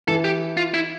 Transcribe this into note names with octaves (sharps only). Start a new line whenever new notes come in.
E3 A4
G4
F4
E4